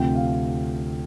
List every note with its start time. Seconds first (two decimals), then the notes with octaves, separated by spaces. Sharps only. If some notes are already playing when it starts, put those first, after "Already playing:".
Already playing: D2 C3 F3 G5
0.16 F5